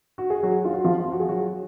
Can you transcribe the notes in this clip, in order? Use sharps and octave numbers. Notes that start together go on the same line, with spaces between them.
F#4
G#4
F#3 F#4
F4
F#4
F3 F4
F#4
G#4
F#3 F#4